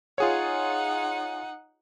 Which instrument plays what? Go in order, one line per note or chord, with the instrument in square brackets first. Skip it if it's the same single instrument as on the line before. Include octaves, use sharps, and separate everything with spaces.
[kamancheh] D#4 F#5 [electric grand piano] F4 G#4 C#5